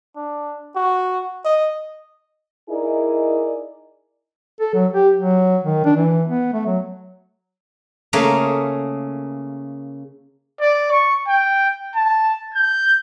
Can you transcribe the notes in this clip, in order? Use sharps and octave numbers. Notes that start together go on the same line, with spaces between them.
D4
F#4
D#5
D#4 E4 G#4 A#4 D5 D#5
A4
F#3
G4
F#3
D#3
D4
E3
B3
A3
F#3
C#3 A3 A#3 G#4 A#4
D5
C#6
G5
A5
G6